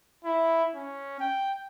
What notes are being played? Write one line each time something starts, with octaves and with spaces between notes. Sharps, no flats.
E4
C#4
G5